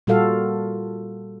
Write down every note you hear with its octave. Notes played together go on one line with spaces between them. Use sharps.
A#2 G3 F4 F#4 A4 F5